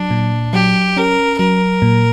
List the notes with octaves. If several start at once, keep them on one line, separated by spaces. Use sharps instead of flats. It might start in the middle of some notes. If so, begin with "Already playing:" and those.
Already playing: F#3 D4
A#2
F#3 G4
C#4 A#4
F#3 A#4
A#2